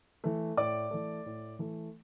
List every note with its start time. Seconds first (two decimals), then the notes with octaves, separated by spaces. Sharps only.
0.24 E3 A3
0.57 A2 D5 D6
0.91 E3 A3
1.26 A2
1.59 E3 A3